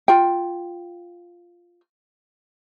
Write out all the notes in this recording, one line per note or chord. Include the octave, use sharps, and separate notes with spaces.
F4 G5